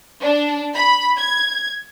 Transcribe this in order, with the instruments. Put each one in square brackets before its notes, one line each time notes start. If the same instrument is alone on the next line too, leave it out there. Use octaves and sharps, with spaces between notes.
[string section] D4
B5
G#6